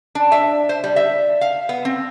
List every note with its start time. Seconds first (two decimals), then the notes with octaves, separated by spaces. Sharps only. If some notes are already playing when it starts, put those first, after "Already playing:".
0.15 D4
0.32 E5
0.69 C5
0.84 G3
0.96 E5
1.41 F5
1.69 B3
1.85 C4